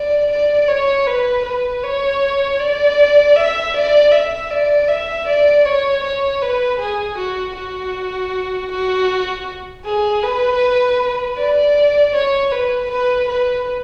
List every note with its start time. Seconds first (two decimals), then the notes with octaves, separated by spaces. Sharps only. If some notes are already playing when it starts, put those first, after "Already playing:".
Already playing: D5
0.30 D5
0.68 C#5
1.07 B4
1.45 B4
1.84 C#5
2.60 D5
3.36 E5
3.74 D5
4.12 E5
4.51 D5
4.88 E5
5.27 D5
5.65 C#5
6.03 C#5
6.42 B4
6.79 G#4
7.18 F#4
7.56 F#4
8.71 F#4
9.85 G#4
10.22 B4
11.37 D5
12.14 C#5
12.52 B4
12.90 B4
13.28 B4